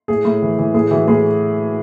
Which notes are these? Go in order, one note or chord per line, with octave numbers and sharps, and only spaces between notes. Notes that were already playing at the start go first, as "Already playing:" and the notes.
A2 G#4
A2
E3
E3
A2 G#4
E3 F#4
A2 G#4